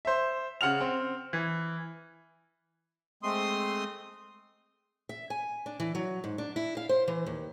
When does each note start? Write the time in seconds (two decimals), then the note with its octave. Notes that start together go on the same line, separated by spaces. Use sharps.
0.05 C5 E5
0.61 C#3 F#5 F6 F7
0.81 C4
1.33 E3
3.23 G#3 A3 C4 C6 D#6
5.09 E5
5.30 G#5
5.66 D4
5.80 E3
5.95 F#3
6.24 G#2
6.38 D4
6.56 E4
6.77 F5
6.89 C5
7.08 E3
7.26 D#2